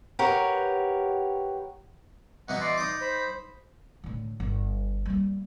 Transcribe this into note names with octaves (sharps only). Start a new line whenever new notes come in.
G4 A#4 B4 C#5 F#5
B2 E3 D#4 F#5
D5 D#5 C6
D#4 D6 D#6
C5 B5
A2 D3
G1
G3 A#3